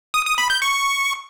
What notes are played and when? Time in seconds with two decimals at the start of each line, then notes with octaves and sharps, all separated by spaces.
0.14 D#6
0.26 D#6
0.38 B5
0.50 G6
0.62 C#6